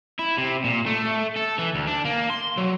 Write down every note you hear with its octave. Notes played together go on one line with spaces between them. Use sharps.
E4
C3
A#2
A3
A4
E3
D2
D4
A#3
C6
F#3